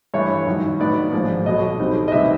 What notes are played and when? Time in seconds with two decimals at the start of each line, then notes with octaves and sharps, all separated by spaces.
0.14 G2 E3 A3 D4 C#5
0.47 F#2 D#3 F#3
0.80 A2 F#3 B3 D#4 D5
1.12 G#1 G#2 F3 A#3
1.46 B1 B2 F#3 D#5
1.79 B1 B2 G3 C4 D#4
2.08 D#5
2.12 D2 C3 D#3 G3 B3 E5